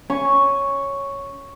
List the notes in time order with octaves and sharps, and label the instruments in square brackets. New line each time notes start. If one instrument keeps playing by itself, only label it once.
[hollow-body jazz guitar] C#4 [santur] C#6